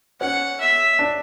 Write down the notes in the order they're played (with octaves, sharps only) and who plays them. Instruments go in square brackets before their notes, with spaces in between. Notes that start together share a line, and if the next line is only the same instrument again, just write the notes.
[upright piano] C#4 [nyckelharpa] F#5
[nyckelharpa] E5
[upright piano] D4